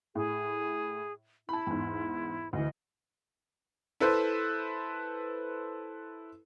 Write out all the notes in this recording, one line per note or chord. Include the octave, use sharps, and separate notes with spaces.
A2 G#4
E4 A5 B5
E2 G#2
D2 E3 D#5
E4 A4 B4 C5